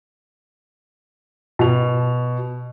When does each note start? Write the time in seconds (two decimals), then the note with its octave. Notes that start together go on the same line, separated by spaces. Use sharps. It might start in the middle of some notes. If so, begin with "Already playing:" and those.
1.59 B2 F7